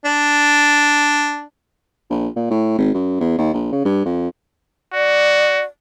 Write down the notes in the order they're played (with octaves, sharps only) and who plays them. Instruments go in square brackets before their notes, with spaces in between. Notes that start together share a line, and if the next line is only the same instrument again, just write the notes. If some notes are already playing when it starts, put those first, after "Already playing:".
[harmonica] D4
[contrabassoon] A#1
A#2
A2
G#1
F#2
E2
D#2
A#1
C#3
G2
F2
[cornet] F#4 [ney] D5